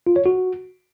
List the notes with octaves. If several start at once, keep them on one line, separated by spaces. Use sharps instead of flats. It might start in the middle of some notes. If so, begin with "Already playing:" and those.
F4
C#5
F#4